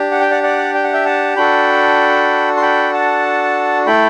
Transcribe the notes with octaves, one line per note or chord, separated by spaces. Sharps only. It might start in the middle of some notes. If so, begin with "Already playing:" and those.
Already playing: D4 G4
F#5
G5
D5 F#5
D5 F#5
G5
F#5
E5 G5
F#5 A5
D4 F#4 A4 G5 B5
C6
G5 B5
F#5 A5
A3 E4 A4 G5 B5